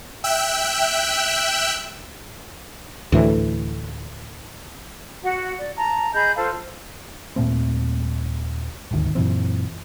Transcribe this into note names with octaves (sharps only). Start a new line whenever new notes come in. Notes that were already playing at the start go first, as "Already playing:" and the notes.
E5 G5 E6 F#6
D2 A2 E3
F#4 F#5
D5
A5 A#5
G#4 D#5 B5 G6
F4 A4 C5 F5
D#1 A#2 A3 C4
D#1 G#1 D2 D#3
F#2 A#2 E3 C4